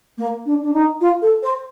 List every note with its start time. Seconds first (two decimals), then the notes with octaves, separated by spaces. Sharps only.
0.17 A#3
0.46 D4
0.62 D4
0.73 D#4
1.00 F4
1.22 A4
1.42 C5